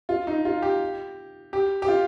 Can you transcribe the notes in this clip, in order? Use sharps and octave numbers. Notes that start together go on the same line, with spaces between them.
F4
D#4
F4
G4
G4
G4
F4